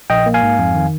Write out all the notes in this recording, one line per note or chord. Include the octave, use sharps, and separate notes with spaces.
A#1 D#5 G5
A#3
F5 G#5
G#2
F2
D#3